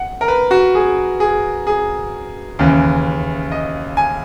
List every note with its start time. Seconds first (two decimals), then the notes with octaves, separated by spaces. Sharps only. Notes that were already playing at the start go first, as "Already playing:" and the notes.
Already playing: F#5
0.21 A#4
0.28 B4
0.51 F#4
0.75 G#4
1.20 G#4
1.67 G#4
2.59 D#2 C#3 E3
3.52 D#5
3.97 G#5